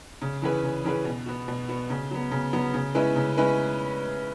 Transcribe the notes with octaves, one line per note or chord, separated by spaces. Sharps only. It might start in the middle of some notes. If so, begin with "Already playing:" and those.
C#3
E3 C#4 G#4 B4
C#3
E3 C#4 G#4 B4
B2
B3 F#4
B2
B3 F#4
C#3
F#3 B3
C#3
F#3 B3
C#3
G#3 C#4 E4 B4
C#3
G#3 C#4 E4 B4